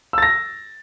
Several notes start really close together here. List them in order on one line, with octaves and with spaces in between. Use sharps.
E6 A6 A#6